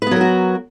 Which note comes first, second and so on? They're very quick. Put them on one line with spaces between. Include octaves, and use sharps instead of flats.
B4 B3 F#3 A#4 F#4